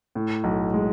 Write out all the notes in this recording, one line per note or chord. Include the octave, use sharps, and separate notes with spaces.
A2
B1
G#3